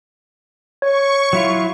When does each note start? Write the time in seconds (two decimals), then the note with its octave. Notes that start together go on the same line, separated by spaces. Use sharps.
0.82 C#5 C#6
1.33 F#3 E4 F4